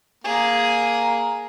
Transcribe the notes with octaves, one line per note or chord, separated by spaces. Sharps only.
A#3 G#4